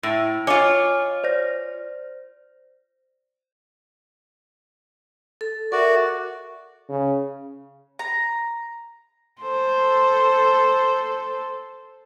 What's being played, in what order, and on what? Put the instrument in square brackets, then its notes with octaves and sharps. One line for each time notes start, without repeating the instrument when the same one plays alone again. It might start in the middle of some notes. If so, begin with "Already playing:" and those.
[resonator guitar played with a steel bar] A2
[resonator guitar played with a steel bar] F4 C#5 [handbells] D#5 G#5 D6
[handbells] C5 D5 A#6
[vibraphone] A4
[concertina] F#4 D5 [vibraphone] A#4 E5
[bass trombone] C#3
[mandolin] A#5
[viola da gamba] A4 C5